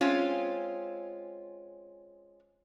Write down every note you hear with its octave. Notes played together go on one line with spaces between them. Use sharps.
G#3 C4 C#4 F4